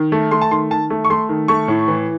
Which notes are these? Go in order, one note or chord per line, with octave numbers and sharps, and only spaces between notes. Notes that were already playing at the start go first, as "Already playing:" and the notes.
Already playing: D#3
A3
A3 C6
A5
D#3 C6
D#3 A5
A3
C#6
A3 C6
D#3
A3 C#6
A2
E3